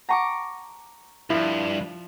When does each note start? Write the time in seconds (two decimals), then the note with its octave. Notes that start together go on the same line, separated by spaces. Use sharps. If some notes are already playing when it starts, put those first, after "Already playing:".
0.09 F#5 G5 A5 A#5 C#6 D6
1.30 C#2 G2 F3 E4